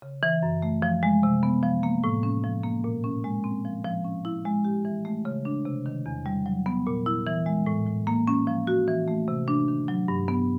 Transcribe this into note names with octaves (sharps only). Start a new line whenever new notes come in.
C#3
E3
F#2
A3
F3
G#3
C3
B3
F3
A#3
A2
C#4
F3
A#3
A#2
C#4
G#3
C4
F3
F3
C#4
E4
G#3
G4
E3
A3
C#3
D4
C3
D#3
E2
G3
F#3
B3
A#2
E4
E3
G#3
A2
A2
A#3
C#4
F3
F#4
E3
A3
C3
D4
D#3
F#3
G2
B3